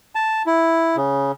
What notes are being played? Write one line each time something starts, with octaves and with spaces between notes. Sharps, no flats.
A5
E4
C#3